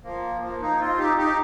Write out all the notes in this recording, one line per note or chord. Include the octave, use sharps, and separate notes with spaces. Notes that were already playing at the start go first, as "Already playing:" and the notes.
F3 A#3
F3 A#3
A#3 D#4
C4 F4
D#4 G4
D#4 G4